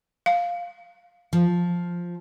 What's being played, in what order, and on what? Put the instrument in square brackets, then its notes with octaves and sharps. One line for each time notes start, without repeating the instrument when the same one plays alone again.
[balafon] F5
[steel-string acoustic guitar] F3